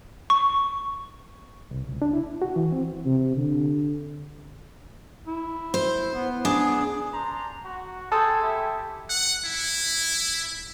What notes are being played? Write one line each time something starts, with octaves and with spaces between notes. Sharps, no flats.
C#6
C2
C#2
D4
E4
F#4
E3
C4
C3
D3
E4
C5
B3
D4 G#4
D4 C5 A#5
F#4
G#4 A4 C5 G5 A5 D#6
E4 G4 E5
F#5
E4